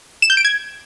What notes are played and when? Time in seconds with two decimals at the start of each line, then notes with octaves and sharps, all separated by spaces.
0.22 E7
0.30 G6
0.37 D7
0.45 G#6